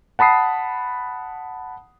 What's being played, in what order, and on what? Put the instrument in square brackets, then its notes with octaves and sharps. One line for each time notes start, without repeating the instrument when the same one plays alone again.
[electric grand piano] F#5 A5 B5 D#6 C7